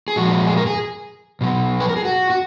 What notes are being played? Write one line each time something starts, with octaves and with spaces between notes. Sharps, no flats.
G#4
A#2 F3 G#3 F#4
G#4
A#4
G#4
B2 F#3
B4
A#4
G#4
F#4
F#4